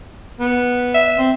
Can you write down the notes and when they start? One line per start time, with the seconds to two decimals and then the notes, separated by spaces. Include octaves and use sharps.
0.40 B3
0.94 E5
1.18 C4